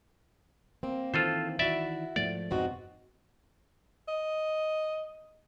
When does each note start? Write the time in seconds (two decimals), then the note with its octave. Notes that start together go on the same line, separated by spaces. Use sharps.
0.83 A#3 C4
1.14 D#3 E3 F4 A4 C5
1.59 E4 F#4 D5 E5
2.16 G#2 F3 A3 D5
2.51 F2 G#2 B2 C4 D#4 F#4
4.08 D#5